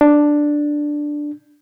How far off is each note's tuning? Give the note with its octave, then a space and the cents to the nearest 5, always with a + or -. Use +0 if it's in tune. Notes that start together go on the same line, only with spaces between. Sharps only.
D4 +5